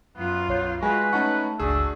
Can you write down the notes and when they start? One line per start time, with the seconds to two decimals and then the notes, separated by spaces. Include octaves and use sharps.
0.17 F#2 B3 F4
0.48 B1 B3 C#5 G6
0.82 G#3 F4 F#4 B4 G#5
1.13 A3 C#4 D#4 F#5 A5 C#6
1.60 G1 C#2 A3 D4 F#4 G#4 E6